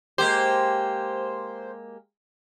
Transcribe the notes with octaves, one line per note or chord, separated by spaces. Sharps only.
G#3 A#3 G4 C5